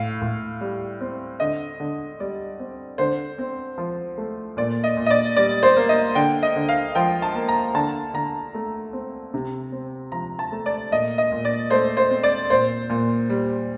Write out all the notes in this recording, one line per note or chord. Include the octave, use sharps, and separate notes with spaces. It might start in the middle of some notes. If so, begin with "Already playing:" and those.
Already playing: A2 F5
A2
G3
C4
D3 D#5
D3
G3 D5
C4
D3 C5
C4
F3
A3
A#2 D5
D#5
A#2
D#5
D5
G3 D5
C5
A#3
D#5
D3 G5
D#5
D3
F5
F3 G5
A5
A#3
A#5
D3 A5
D3 A#5
A3
C4
C3
C4
F3 A#5
A5
A3
D5
A#2 D#5
D#5
A#2
D5
A3 C5
C5
C4
D5
A#2 C5
A#2
G3